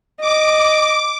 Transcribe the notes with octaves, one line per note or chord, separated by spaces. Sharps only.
D#5 D6